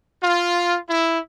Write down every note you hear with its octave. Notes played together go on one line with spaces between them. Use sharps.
F4
E4